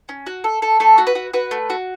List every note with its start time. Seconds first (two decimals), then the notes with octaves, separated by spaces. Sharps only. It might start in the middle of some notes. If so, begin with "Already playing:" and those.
0.09 C#4
0.27 F#4
0.44 A4
0.62 A4
0.80 A3 A4
0.98 F#4
1.07 B4
1.15 F#4
1.33 F#4 B4
1.51 A3
1.70 F#4